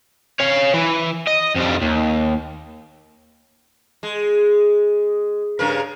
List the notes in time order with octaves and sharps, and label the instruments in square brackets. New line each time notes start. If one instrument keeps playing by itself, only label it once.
[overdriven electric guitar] C#5 F5
E3
D#5
F2 G3
D#2
[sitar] G#3
G2 C#3 A#4